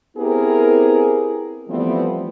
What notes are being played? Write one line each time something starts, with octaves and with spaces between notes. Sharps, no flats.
B3 C4 E4 G4 G#4 A#4
E3 F3 G3 A3 B3 C4